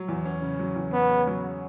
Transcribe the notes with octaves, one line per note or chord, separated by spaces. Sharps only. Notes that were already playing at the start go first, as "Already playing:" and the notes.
Already playing: F#3
E2
C#4
C#3
F#3
E2
B3 C#4
C#3
F#3